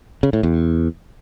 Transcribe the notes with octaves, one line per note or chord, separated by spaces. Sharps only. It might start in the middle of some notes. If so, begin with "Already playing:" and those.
C#3
A2
E2